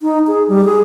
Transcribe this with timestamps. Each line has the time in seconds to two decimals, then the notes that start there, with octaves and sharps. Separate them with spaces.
0.02 D#4
0.27 G#4
0.48 G3
0.65 G#4